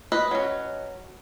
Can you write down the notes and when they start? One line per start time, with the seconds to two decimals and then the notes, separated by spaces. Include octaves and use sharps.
0.12 B4 D#5
0.31 F#3 C#4